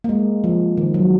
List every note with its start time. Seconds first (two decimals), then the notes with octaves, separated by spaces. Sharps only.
0.04 A#3
0.09 G#3
0.44 F3
0.77 D#3
0.94 F#3